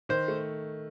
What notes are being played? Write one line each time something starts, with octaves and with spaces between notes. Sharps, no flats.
D#3 C5
A3